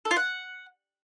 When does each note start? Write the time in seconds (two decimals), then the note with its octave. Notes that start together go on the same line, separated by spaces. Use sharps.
0.05 A4
0.11 F4
0.16 F#5